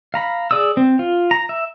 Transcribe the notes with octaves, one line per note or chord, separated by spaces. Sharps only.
F5 A#5 B5
G#4 D5 D#6 E6
C4
F4
A#5
E5